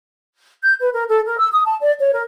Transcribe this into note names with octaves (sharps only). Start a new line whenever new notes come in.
G6
B4
A#4
A4
A#4
E6
D#6
A5
D5
C#5
A#4